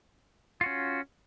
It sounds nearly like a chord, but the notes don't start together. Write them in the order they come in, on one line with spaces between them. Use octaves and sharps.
F4 F#4 C#4